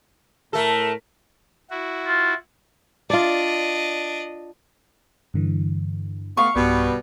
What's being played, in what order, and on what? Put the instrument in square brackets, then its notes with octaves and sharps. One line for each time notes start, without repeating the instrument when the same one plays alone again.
[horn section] A2 A#4 [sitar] A3 A4
[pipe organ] E4 F#4
[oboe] F4
[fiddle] D4 D#5 [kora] F4 D5
[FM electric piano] G2 D3 E3
[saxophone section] A3 B3 F5 [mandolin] C#6
[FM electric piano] B1 G2 [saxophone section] B2 G3 B3